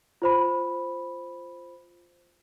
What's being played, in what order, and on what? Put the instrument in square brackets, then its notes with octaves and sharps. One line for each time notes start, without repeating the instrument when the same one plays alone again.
[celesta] F4 C5 B5